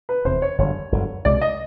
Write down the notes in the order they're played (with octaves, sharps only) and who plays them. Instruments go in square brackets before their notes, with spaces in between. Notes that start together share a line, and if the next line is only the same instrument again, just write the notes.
[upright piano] B4
[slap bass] F1 E2 C3 [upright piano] C5
[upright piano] C#5
[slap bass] G1 F#2 D3 [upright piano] C#5
[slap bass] G1 F#2 D3
[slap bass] C2 B2 G#3 [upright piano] D5
[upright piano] D#5